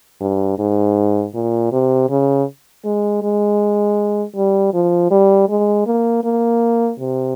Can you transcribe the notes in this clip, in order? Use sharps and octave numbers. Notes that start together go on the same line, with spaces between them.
G2
G#2
A#2
C3
C#3
G#3
G#3
G3
F3
G3
G#3
A#3
A#3
C3